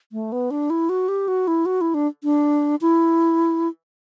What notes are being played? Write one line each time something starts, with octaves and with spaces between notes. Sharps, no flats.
A3
B3
D4
E4
F#4
G4
F#4
E4
F#4
E4
D4
D4
E4